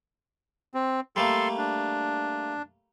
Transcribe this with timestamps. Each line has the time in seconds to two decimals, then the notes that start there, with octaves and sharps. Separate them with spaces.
0.74 C4
1.16 G3 A3 A#3 A4 C6
1.58 D4